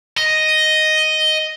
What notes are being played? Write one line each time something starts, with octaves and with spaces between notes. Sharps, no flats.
D#5